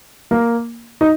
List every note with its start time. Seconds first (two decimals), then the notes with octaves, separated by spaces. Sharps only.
0.31 A#3
1.01 D#4